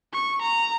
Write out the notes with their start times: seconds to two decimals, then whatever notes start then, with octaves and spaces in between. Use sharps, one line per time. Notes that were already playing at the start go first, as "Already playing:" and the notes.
0.13 C#6
0.42 A#5